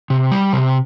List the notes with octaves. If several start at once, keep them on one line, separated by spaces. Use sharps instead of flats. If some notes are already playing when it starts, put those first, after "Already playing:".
C3
G3
C3